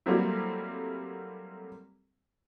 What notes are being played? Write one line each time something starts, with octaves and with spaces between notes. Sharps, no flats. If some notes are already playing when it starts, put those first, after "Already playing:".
F#3 G3 A3 A#3 C4 E4